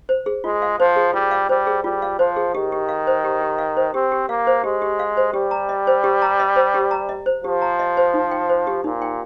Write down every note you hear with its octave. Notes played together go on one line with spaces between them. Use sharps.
C5
G#4
G#3 F4
F5
F3 C5
G#4
G3 F4
F5
G3 C5
G#4
G3 F4
F5
F3 C5
G#4
D#3 G4
G4
F5
C5
G4
G4
F5
C5
C4 G4
G4
A#3 F5
C5
G#3 G4
G4
F5
C5
G3 G4
A#5
D#5
C5
G4
A#5
D#5
C5
G4
A#5
D#5
C5
F3 G4
A#5
D#5
C5
D#4
G5
C5
G4
A#2 D#4
G5